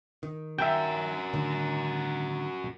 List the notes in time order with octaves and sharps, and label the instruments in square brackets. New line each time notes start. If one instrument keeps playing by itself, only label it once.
[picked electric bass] D#3
[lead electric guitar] F#4 A#4 [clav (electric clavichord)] E5 G5
[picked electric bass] A2 D3 D#3